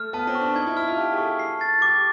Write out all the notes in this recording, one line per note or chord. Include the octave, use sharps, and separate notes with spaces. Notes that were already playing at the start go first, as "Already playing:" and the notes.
Already playing: A3 F6
B3 A5
C4
C#6
D4
D#4 G#6
E4
E4 F6
F4
G4 A5
G#4
A4 C#6
C7
A6
G4 D6